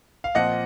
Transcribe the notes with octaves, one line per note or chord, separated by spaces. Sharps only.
F5
A#2 F3 C4 D#5 F#5